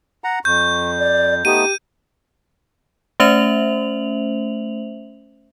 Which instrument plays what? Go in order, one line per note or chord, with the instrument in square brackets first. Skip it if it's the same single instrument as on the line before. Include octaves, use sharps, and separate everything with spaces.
[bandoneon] F#5 A#5
[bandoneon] F2 [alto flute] C#6 [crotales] G6
[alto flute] D5
[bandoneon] A3 B3 D#4 [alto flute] G4 [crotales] D#7
[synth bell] A3 C#4 C5 E5 F7 F#7